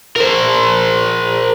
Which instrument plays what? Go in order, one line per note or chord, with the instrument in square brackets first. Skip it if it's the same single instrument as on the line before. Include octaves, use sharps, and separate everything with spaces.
[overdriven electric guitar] A#4 C5